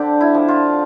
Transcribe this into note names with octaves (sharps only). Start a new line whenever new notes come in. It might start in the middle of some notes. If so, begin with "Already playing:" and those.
Already playing: D3 C4 D4 G4
E4
F3
F4